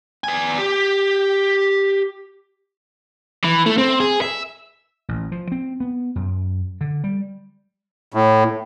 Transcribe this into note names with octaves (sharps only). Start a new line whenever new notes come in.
B3 G#5
G4
E3
A3
C4
G#4
E5
A1
F3
C4
B3
F#2
D3
G3
A2